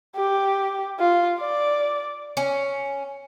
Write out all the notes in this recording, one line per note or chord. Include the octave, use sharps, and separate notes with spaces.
G4
F4
D5
C#4